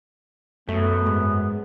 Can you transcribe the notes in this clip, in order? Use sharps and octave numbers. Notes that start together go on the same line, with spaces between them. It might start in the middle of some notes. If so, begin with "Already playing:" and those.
F#2 A3 B3
G#2